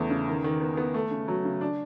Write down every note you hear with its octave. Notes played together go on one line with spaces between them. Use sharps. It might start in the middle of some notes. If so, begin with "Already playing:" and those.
Already playing: E2 C#3 A3
C#3
D#3
D#3
B3
B3
A3
C#3
F#3
C#3
D4